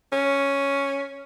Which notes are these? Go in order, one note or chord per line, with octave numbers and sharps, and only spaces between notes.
C#4